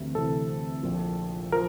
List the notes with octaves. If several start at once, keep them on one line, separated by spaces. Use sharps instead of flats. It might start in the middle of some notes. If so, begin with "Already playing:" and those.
Already playing: D2 C3 E3
D2 C3 E3 A4
A#1 A#2 F3
F3 A#4